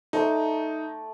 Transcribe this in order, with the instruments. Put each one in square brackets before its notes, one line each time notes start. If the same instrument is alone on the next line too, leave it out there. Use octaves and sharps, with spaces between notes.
[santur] A3 D5 C6 [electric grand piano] D#4